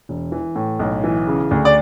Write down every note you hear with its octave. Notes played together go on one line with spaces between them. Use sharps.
E1
E3
A2
B1
E3
C#3
D2
D5